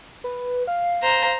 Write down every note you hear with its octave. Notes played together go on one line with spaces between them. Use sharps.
B4
F5
C5 A#5